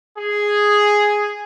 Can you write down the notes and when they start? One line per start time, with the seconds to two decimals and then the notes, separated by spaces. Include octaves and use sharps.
0.17 G#4